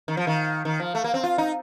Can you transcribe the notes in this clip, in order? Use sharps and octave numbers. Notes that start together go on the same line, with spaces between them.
D#3
F3
D#3
D#3
F3
A3
A#3
C4
F4
D#4